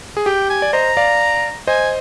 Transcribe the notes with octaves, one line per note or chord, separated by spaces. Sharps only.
G#4
G4 G5
G#5
D5
C5 D#5 A#5
D5 F5
C5 D#5 G#5